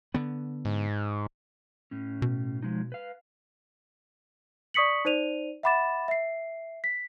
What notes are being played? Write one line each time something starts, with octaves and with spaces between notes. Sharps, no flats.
D3 B3
G#2
A2 C#4
B2
F3 G#3 D#4
B4 F5
D5 C#6 D#6 B6 C#7 F#7
D#4 C5 D5 D#7 F7
E5 F#5 B5 D6 A6 E7
E5 C7
B6